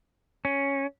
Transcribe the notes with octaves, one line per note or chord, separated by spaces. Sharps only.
C#4